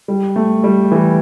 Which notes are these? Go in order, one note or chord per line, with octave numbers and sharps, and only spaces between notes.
G3
A3
G3
E3